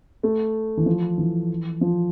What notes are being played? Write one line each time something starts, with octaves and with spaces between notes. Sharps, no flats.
A3
E3
F3
E3
F3